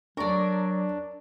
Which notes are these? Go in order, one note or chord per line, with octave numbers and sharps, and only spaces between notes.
F#3 D4 A#4 D5 C#6